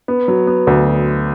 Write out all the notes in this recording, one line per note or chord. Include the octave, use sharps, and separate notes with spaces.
B3
F#3
B3
D2